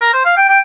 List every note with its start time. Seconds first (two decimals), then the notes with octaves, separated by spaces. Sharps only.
0.01 A#4
0.13 C5
0.25 F5
0.37 G5
0.49 G5